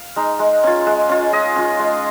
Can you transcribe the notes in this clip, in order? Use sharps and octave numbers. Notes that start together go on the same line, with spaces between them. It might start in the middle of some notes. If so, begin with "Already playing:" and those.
Already playing: F5
G#3 D#4
G#3
C#4 F4
G#3
C#4 F4
G#3 D#5
C#4 F4
G#3